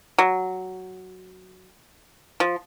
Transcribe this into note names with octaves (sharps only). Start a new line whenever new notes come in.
F#3
F3